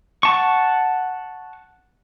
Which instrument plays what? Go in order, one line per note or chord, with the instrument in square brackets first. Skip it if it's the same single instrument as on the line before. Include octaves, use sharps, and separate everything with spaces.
[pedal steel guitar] F#5 A5 C#6